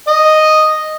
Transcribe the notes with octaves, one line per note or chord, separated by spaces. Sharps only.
D#5